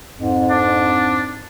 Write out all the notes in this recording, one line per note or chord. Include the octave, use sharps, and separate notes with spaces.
F2 G#2
D4